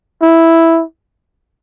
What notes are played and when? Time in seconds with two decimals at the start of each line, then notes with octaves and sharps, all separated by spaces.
0.22 E4